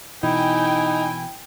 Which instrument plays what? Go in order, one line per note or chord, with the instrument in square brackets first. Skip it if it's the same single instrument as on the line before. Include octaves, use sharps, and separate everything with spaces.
[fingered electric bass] B2 E3 [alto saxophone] D#4 [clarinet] E4 [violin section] G5 G#5